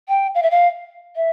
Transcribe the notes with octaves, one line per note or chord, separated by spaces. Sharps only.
G5
F5
E5
F5
E5